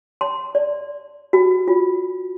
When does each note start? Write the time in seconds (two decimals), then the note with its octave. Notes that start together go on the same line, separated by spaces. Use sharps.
0.21 C6
0.55 D5
1.33 F#4
1.68 F4